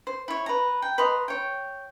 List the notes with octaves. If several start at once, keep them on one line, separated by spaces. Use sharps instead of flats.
C5
E4 C#5
B4 A#5
G5
B4 D#5 A#5 C6
C#5 G5